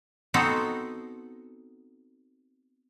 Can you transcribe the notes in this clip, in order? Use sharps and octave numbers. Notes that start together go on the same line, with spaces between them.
B3 C4 D#4 F#4 A4 C5